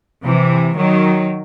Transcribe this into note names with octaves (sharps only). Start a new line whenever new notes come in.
C3 E3
D#3 F#3